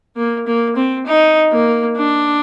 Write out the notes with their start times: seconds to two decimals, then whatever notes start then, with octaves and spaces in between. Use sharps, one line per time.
0.16 A#3
0.47 A#3
0.76 C4
1.06 D#4
1.52 A#3
1.97 D4